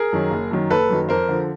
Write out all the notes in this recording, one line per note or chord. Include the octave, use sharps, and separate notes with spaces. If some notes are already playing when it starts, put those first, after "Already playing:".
Already playing: G#4 A#4
F#2 D#3 F#3
F#1
F#2 D#3 F#3
F#1 A4 B4
F#2 D#3 F#3
F2 A#4 C5
D3 F3